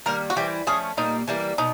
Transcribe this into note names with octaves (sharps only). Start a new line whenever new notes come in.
D#3 G3 A#3 A#4
F#4
E3 G3 C4 E4 G4
F3 A3 C#4 G#4
A#2 G3 A#3 D#4
E3 G3 A#3
B2 D#4